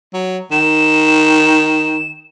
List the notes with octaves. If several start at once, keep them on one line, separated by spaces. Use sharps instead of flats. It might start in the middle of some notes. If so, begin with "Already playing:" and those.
F#3
D#3 E7